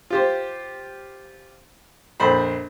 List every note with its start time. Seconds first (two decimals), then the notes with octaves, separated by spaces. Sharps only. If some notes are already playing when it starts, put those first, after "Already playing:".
0.10 F4 G4 C5
2.20 A#1 F2 C5 B5